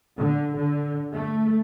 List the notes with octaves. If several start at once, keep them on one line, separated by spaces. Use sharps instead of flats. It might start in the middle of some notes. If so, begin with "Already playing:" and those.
D3
D3
A3